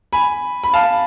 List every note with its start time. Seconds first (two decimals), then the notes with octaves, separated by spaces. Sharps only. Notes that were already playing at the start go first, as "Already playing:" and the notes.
0.13 G#5 B5
0.64 B5
0.74 F5 A5